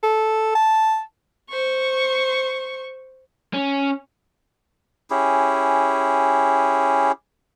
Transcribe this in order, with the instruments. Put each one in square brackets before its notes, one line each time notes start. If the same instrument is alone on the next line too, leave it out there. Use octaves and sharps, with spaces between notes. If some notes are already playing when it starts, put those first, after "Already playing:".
[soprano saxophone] A4
A5
[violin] C5 C#6
[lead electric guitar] C#4
[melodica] C#4 E4 G4 G#4